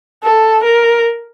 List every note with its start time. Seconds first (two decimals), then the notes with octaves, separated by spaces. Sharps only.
0.23 A4
0.64 A#4